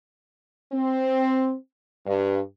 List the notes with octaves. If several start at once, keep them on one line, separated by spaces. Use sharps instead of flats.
C4
G2